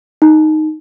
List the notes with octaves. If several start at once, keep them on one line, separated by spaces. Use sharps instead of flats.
D#4